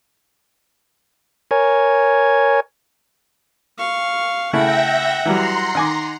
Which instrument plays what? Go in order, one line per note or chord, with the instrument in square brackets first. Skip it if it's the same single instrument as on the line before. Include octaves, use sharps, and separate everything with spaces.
[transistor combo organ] A#4 C#5 G#5
[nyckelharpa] F5 C#6
[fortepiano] C#3 A3 E4 [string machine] E5 G5 A#6 [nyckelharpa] F#5
[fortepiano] E3 F#3 G3 [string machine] A#5 C6
[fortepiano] D#3 G#5 D6